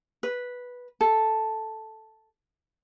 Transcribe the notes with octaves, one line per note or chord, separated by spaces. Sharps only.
B4
A4